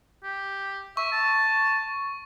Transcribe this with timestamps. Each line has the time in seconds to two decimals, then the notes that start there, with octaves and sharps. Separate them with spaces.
0.23 G4
0.97 E5 C#6
1.12 A5